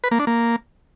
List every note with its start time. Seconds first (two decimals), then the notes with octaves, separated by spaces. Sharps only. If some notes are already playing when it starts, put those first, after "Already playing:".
0.04 B4
0.11 A#3
0.19 D4
0.27 A#3